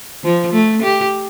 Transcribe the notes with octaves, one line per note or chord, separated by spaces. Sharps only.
F3
A3
G4